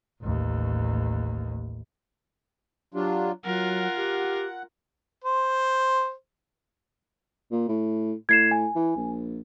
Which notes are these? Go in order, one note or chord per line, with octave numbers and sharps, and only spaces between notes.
A1 D#2
F#3 D4 F4 G4
F#3 F4 A#4 F#5
G4
C5
A#2
A2
A2 G#6 C7 E7
G#5
E3
A#1